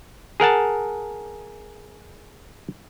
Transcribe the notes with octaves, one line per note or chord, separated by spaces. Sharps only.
G#4 A#4 F#5 A5